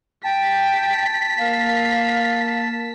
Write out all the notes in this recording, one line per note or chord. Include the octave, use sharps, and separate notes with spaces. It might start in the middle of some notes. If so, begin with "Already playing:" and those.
G5 A5 B6
A#3 F5